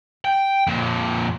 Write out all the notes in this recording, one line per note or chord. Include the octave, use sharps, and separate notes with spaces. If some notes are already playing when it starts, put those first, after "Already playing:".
G5
F2 A#2